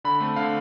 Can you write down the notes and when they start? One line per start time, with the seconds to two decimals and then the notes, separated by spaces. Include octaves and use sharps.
0.04 D3 B5
0.20 A3 C4
0.36 D3 F5